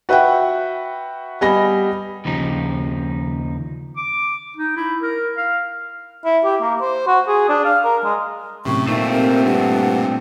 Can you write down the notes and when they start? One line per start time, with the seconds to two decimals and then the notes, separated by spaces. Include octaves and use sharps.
0.09 F#4 B4 E5 F#5 G5
1.41 G3 B3 D#5 G#5 B5 A#6
2.25 D#2 C#3 F3 D#4
3.97 D6
4.57 D#4
4.77 E4
5.02 A#4
5.37 F5
6.25 E4
6.45 G4
6.62 A#3
6.81 C5
7.07 F#4
7.28 G#4
7.49 D4
7.65 F5
7.84 A#4
8.04 G#3
8.65 F#2 A2 C3 C#6
8.88 A#2 D#3 A3 C4 E5
9.11 C3 A#4
9.45 G2 F#5